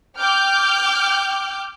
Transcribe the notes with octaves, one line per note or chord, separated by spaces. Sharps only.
G5 D6 F6 G6